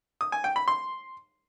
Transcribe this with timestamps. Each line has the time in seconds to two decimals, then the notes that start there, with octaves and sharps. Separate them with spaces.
0.21 D#6
0.32 G#5
0.44 G5
0.56 B5
0.68 C6